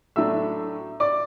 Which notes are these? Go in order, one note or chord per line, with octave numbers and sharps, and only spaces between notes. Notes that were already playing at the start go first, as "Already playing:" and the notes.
A2 F#3 A3 D4 E5 E6
D5 D6